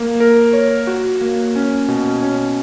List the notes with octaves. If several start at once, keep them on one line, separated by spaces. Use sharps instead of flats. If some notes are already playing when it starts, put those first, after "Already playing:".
Already playing: A#3
A#4
C#5
F#4
A#3
C#4
B2
C#4